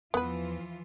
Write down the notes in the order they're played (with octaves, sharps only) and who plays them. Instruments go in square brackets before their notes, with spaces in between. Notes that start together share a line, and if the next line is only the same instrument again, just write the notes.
[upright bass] E2 [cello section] E3 F3 F4 [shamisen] B3 B4